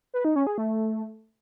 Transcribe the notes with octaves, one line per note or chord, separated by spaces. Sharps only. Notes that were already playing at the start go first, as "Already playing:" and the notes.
B4
D#4
C#4
G#4
A3